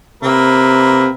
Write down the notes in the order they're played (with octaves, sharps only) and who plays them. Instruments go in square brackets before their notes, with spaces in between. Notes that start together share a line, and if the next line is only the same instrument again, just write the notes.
[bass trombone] C3 [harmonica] A#3 C4 B4